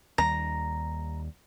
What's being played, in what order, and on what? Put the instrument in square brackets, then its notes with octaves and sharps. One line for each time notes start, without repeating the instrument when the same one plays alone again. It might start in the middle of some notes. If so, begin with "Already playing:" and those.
[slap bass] D#2 G3 [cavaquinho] A#5